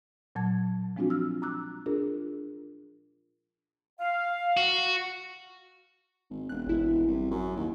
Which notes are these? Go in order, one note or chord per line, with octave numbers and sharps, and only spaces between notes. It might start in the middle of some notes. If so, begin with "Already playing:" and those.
A#2 F#3 A5 G#6
F3 G#3 C4 D4 F4 F#4
E6 F6
A#5 D6 E6 F#6
D4 F4 G#4 A#4
F5
F#4
G#1
E1 F#6
G#1 E4
C2
F#2
D#2